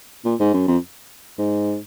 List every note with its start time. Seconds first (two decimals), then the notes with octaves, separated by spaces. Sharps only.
0.25 A#2
0.40 G#2
0.54 F#2
0.68 F2
1.38 G#2